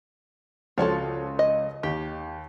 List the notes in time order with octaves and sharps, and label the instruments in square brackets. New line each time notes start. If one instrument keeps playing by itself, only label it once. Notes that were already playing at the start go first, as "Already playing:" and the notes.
[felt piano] C#2 C#5 C6 [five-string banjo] F3 F#4 A4
[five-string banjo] D#5
[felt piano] D#2 [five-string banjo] G4